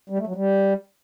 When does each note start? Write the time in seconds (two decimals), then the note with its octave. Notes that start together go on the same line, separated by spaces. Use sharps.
0.10 G3
0.18 A3
0.27 F#3
0.36 G3